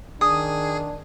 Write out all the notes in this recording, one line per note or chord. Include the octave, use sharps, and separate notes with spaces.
D#3 D4 G#4 D#6